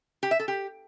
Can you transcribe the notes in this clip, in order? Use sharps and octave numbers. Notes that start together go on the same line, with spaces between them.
G4
E5
A4
G4